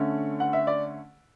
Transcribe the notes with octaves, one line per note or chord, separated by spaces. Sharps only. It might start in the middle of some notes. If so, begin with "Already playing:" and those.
Already playing: D3 A3 C#4
F#5
E5
D5